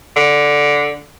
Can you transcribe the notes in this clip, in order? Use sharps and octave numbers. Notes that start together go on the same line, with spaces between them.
D3